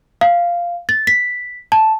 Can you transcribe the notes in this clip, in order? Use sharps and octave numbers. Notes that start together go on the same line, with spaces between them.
F5
A6
B6
A5